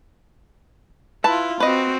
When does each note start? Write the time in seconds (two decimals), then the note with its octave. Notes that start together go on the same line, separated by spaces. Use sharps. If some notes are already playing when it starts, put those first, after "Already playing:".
1.24 E4 F4 B4 A5
1.60 C4 F#4 B4 D#5